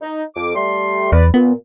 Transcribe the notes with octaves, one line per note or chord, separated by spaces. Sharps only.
D#4
F2 D6
G3 A3 C6
E2 B4 D5
A#2 B3